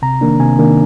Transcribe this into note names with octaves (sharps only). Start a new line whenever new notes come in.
C3 A#5
D#3 A#3 D4
C3 G#5
D#3 A#3 D4